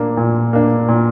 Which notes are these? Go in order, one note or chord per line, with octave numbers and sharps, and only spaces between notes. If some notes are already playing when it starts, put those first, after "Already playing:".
Already playing: A#2 A#3 D4
A#2
A#3 D4
A#2